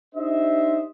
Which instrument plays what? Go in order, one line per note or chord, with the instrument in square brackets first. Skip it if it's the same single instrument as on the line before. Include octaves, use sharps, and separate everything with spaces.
[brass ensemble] D4 D#4 G4 C5 D#5 E5